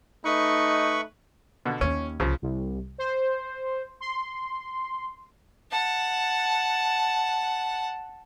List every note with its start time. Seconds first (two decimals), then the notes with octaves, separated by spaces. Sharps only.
0.25 A3 D#4 B4 C#6
1.66 B2 D3
1.81 D#2 C#4
2.20 C2 C#3 F3
2.42 C2
2.98 C5
4.00 C6
5.72 F#5 A5